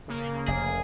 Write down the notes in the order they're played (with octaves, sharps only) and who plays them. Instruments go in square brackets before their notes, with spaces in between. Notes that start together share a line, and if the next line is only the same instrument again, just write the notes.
[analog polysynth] C#3 A#3
[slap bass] F1 [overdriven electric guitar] G#4